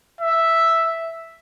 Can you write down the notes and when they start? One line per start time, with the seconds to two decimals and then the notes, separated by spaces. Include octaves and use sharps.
0.21 E5